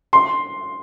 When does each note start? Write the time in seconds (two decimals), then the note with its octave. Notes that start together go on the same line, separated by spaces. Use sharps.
0.13 C6